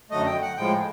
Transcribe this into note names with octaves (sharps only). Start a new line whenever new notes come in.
F#2 D3 F#3 A3 D#5
G5
F#5
A2 F3 G#3 G5